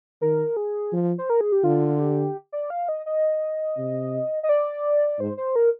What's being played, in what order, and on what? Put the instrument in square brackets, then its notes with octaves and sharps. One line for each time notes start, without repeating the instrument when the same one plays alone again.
[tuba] D#3 [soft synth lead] A#4
[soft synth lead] G#4
[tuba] F3
[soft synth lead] C5
A#4
G#4
G4
[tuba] D3 [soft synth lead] F4
[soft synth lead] G4
D5
F5
D#5
D#5
[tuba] C3
[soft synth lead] D#5
D5
[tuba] G#2 [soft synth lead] C5
[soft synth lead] C5
A#4